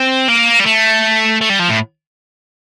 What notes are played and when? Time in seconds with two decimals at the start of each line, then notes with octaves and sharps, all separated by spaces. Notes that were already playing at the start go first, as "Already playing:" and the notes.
Already playing: C4
0.29 A#3
0.60 G3
0.66 A3
1.41 A3
1.50 G3
1.59 F3
1.69 A2